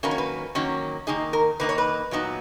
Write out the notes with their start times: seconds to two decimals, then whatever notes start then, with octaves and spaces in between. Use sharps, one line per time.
0.03 D#3 F#3 A#3 C#4 B4
0.11 C#5
0.18 B4
0.55 D#3 F#3 A#3 C#4
1.07 D#3 A#3 D#4 G#4
1.33 A#4
1.60 D#3 A#3 D#4 B4
1.69 C#5
1.78 B4
2.11 A#2 F#3 B3 D#4